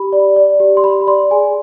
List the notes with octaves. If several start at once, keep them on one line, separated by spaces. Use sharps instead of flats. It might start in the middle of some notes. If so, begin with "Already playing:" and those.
Already playing: G4 B5
D5
D5
G4
C6
G4 B5
D5 C6
G#4 G#5